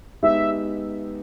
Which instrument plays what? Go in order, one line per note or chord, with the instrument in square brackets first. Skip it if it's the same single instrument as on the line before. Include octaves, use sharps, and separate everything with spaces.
[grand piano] G#3 B3 D#4 G4 [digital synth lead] E5